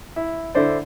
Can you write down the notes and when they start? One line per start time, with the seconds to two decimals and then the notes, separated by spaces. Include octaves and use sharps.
0.16 E4
0.55 D3 E4 C5 D5